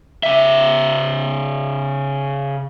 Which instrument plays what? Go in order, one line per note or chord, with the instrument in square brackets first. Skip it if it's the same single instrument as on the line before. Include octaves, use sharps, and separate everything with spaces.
[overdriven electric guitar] C#3 E5